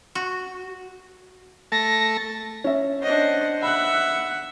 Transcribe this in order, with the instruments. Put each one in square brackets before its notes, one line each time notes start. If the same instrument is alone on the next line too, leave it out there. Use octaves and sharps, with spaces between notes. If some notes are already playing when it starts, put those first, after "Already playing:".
[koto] F#4
[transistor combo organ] A3 A5 [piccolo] A#6
[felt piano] C#4 E5
[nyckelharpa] D4 D#5 [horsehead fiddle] C5 F#5
[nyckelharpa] E5 [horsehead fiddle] F#5 [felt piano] B5 F#6